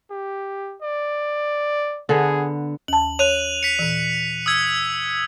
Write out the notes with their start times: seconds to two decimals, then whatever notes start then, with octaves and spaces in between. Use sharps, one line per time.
0.10 G4
0.82 D5
2.09 D3 B3 G#4
2.88 D#2 A5 F#7
3.19 C#5 F#6 D#7 F7
3.63 B6 C#7
3.79 A#2 E3
4.46 D#6 E6 G#6